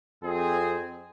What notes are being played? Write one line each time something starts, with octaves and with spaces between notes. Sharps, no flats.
F2 C4 G#4